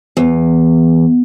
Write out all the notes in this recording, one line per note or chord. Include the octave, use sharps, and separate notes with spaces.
E2